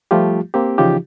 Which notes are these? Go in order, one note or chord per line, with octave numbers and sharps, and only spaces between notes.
F3 G3 A3 F4 G4
A#3 C4 G4
C#3 E3 F3 D#4 F4 G4